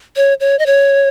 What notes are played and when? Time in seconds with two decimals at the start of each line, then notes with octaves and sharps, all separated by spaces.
0.16 C#5
0.40 C#5
0.59 D#5
0.66 C#5